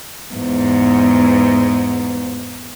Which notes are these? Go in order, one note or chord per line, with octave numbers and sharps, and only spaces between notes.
E2 G#2